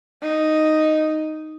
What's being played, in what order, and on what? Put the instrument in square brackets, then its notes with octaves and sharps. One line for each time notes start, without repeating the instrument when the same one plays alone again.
[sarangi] D#4